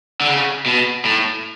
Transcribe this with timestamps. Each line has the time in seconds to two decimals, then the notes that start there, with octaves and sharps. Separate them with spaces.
0.21 D3
0.28 C#3
0.66 B2
1.05 A2